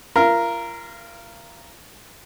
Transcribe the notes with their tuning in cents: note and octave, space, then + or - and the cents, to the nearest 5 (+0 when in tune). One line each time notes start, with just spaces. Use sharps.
F4 -35 A#4 +0